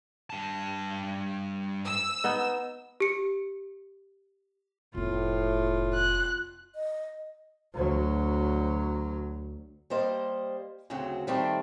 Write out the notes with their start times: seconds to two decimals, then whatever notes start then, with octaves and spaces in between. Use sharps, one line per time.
0.30 G2 A5
1.86 E6
2.24 B3 D#4
3.00 G4 C#7
4.95 F1 A2 B3 F4
5.94 F#6
6.75 D#5
7.74 D2 F#3
9.90 G3 A#3 C5 D#5
10.90 D2 C#3 F#3 C4 F#4
11.27 D#3 G3 A3 C4 D4